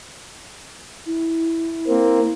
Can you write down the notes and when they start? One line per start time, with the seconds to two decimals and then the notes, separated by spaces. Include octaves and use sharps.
1.06 E4
1.88 A#3 C4